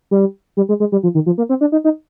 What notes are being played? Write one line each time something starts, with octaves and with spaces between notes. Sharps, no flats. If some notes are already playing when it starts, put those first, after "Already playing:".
G3
G3
G#3
G#3
G3
F3
D#3
F3
A#3
C4
D4
D#4
D#4